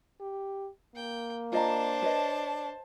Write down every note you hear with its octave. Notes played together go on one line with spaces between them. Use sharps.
G4
A#3 G5
D4 F4 C5 D#5 A5 A#5
B4 C#5 D#5